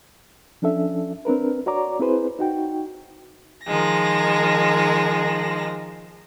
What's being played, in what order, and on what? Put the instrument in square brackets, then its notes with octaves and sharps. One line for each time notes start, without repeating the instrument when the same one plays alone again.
[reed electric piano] F3 C#4 D4 A4 E5
C4 D4 A#4 B4
F#4 C#5 D5 A#5 D6
C4 E4 G#4 B4 C5
D#4 F#4 G5
[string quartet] D#3 F3 G#3 A#6